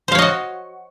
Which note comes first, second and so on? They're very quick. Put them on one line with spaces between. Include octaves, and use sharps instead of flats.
C5 F5 C#5 D#5 F#4